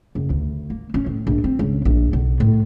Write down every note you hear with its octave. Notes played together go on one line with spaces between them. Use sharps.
F#1
D2
A#3
C#4
A2
A#1
C4
C#2
A#1
B1
A2